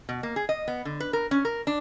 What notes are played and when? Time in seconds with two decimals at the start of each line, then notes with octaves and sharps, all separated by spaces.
0.09 B2
0.23 A#3
0.36 G#4
0.49 D#5
0.68 B3
0.85 D3
1.00 B4
1.13 A#4
1.31 C#4
1.45 A#4
1.67 D4